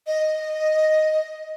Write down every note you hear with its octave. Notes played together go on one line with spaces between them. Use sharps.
D#5